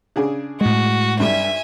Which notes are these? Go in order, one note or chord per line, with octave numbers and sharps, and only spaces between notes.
C#3 D4 G#4
A2 G#3 F#4
B1 G2 E5 G#5